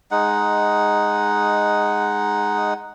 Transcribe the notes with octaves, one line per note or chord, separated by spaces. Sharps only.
G#3 D#4 F#5